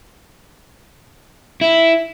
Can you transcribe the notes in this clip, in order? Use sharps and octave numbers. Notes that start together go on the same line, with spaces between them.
E4